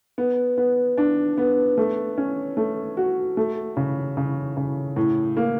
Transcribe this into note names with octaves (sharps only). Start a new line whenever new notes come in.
B3
B3
D4
B3
A3
C#4
A3
F#4
A3
C#3
C#3
C#3
A2
A#3